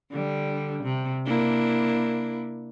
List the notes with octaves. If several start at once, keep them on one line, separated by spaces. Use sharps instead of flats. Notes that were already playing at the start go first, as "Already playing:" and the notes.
D3 G3
C3
A#3 D4 E4